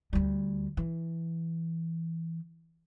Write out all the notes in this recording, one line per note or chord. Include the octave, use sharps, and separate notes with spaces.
D2 G3
E3